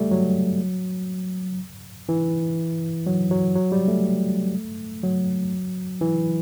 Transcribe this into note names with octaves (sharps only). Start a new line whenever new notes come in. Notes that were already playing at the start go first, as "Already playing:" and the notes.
Already playing: G3 A3
F#3
E3
F#3
F#3
F#3
G3
A3
F#3
E3